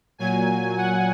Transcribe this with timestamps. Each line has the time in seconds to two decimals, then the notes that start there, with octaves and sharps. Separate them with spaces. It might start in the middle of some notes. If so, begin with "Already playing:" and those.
0.18 A#2 F#3 G#5
0.77 F#5